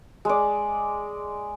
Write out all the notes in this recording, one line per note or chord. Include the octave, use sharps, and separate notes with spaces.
G#3 D5